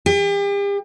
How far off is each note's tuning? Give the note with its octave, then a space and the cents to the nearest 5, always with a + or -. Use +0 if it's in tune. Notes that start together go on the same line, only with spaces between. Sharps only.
G4 +40